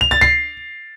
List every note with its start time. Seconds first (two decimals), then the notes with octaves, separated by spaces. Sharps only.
0.01 F7
0.11 A6
0.21 C7